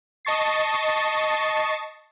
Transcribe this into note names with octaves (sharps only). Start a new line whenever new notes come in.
D#5 A5 C#6 A6 C7